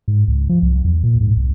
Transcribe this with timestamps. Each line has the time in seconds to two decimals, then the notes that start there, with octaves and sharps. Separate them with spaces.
0.08 G#2
0.28 C#2
0.49 F3
0.63 C2
0.84 E2
1.04 A#2
1.21 G#2
1.36 C2